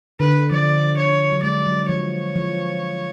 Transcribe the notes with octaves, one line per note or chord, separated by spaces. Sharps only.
D3 B4
F3 D5
C#5
F#3
G#3 D5
F#3
F3 C#5
F3